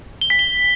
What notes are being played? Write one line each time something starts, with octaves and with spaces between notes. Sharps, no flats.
G7
B6
G7